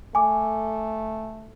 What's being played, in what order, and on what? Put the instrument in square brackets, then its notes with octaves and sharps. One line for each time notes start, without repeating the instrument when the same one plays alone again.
[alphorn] A3 [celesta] G#5 D6